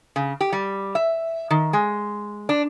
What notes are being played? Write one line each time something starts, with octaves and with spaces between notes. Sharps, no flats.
C#3
G4
G3
E5
D#3
G#3
D4